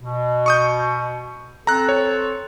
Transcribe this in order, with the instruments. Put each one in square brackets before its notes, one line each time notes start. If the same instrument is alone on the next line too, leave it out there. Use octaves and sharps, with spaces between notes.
[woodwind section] B2
[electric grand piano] C#6 D#6 G6
[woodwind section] C4 A4 [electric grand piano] A#5 F#6
[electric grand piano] C#5